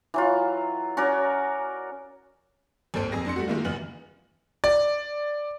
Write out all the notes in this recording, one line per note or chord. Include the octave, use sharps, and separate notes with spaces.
E3 F#3 F4
C#4 F#4 A#4 D5
G#1 D#2 A4 C5 D7
F2 G#4 A#6
F2 D4 C6 C#7
G3 A3 F#4
D#3 G#3 A#3 E4 F4
F#1 E2 E3 B3 F6 F#7
D5